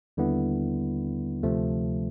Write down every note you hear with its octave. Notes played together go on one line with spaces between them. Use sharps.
D#2 D3 G3 B3 E4
D2 C3 F3 A3